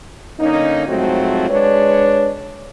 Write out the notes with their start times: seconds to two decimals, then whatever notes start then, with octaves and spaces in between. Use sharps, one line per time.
0.38 D3 A#3 C#4 D#4
0.87 G#2 F3 F#3 A3 C4 F#4
1.49 G#3 D4 B4 C#5